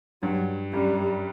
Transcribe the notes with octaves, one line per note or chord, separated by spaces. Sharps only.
G2 F#3
F#2 G3